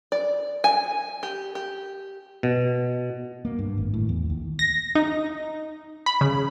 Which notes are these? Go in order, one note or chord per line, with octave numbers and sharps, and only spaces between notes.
D5
G#5
G4
G4
B2
A#3
G2
G#1
A2
E2
D#2
A#6
D#4
B5
C#3